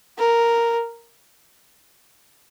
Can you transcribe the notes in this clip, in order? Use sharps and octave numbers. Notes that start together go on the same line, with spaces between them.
A#4